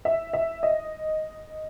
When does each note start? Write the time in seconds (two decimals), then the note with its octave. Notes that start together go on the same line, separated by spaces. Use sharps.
0.05 E5
0.33 E5
0.63 D#5